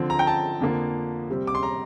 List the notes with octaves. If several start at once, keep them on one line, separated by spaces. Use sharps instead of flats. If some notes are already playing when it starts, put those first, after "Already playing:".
Already playing: D3 F3 C4
A#5
G5
A5
F2 D3 F3 A#3
C3 G3 C4
D6
C6
A#5